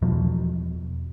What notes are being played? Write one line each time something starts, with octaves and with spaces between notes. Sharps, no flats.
E2 B2 F3 F#3